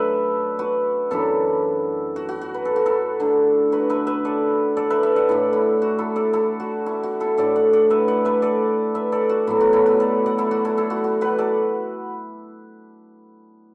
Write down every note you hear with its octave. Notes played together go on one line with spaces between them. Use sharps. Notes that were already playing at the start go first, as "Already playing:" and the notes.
Already playing: F#2 F#3 A3 D4 A4 B4 D5 E5
F#4 B4
F#2 E3 D4 E4 A4
F#4
F#4
F#4
B4
A4
F#4
E4 A4
D3 A3 D4
F#4 B4
B4 E5
B4 E5
A4 D5
A4 D5
B4 E5
B4 E5
D5 F#5
A2 A3 D4 E4
E4
F#4
E4 A4
A4 D5
E4 A4
F#4
E4
F#4
E4 A4
A2 A3 D4 A4 D5
D5 F#5
D5 F#5
B4 E5
D5 F#5
B4 E5
A4 D5
B4 E5
A4 D5
F#4
A2 F#3 B3 E4
F#4
E4 A4
F#4 B4
A4 D5
D5 F#5
E4 A4
F#4
E4 A4
E4 A4
F#4
F#4
F#4 B4
A4 D5